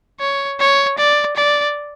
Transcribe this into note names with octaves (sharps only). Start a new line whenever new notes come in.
C#5
C#5
D5
D5